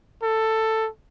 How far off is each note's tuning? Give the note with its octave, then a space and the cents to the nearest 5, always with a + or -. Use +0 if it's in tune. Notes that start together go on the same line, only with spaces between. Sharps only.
A4 +10